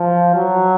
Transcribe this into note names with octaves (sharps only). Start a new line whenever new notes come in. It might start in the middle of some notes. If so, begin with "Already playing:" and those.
Already playing: F3
F#3